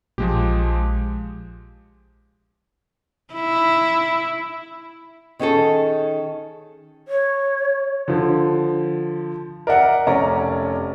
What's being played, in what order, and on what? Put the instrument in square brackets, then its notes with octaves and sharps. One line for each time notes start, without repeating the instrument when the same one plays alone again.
[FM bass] A#1 [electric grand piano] F3 G#3 G4
[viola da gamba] E4
[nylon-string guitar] D#3 C#4 G#4 A4
[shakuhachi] C#5
[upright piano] D3 F3
A#4 D5 E5 F#5
F1 C#4 D5 A#5